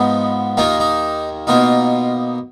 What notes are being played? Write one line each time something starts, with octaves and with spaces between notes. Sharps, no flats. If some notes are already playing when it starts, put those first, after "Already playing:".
Already playing: G#2 F3 B3 D#4
D#2 D#3 A#3 D#4 F4
D#4
B2 A#3 D#4 F4